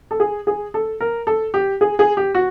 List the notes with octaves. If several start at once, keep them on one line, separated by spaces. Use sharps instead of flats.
A4
G#4
G#4
A4
A#4
A4
G4
G#4
G#4
G4
F#4